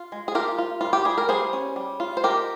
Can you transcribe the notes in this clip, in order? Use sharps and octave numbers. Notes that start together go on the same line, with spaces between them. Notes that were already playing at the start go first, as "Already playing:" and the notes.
Already playing: F4
G#3
G#4
F4 G4 A#4
F4
G3 F4
G4
G3 G#4
A#4
G3 G#4 C5
C#4
G3
F4
C5
G#3 G4 A#4